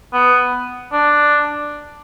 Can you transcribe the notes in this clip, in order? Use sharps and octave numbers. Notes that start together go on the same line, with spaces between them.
B3
D4